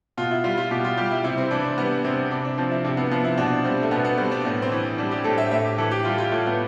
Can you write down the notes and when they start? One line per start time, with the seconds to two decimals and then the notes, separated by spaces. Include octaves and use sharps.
0.17 B2 F4
0.31 E4
0.44 G3 F4
0.57 F4
0.71 B2 G4
0.84 F4
0.97 G3 G4
1.11 E4
1.24 C3 E4
1.38 C4
1.51 E3 D4
1.64 C4
1.78 G3 B3
2.04 C3 C4
2.31 C3 D4
2.45 D4
2.58 F3 C4
2.71 E4
2.84 C3
2.97 B3
3.11 F3 B3
3.24 E4
3.38 B2 D4
3.65 G3 C4
3.82 A3
3.91 B2 B3
4.05 B3
4.18 G3 C4
4.31 D4
4.44 A2 B3
4.62 C4
4.72 E3
4.98 G3 D4
5.11 G4
5.24 A2 A4
5.38 E5
5.51 A2 E5
5.65 G4
5.78 E3 A4
5.91 G4
6.05 G3 F4
6.18 F4
6.31 A2 A3
6.47 B3